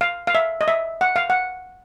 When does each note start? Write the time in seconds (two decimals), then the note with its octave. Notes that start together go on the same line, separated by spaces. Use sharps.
0.01 F5
0.27 F5
0.35 E5
0.61 D#5
0.68 E5
1.01 F#5
1.16 F5
1.30 F#5